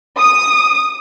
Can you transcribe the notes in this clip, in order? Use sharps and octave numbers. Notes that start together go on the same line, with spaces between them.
D#6